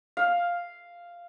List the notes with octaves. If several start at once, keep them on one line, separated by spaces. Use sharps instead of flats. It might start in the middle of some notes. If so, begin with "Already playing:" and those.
F5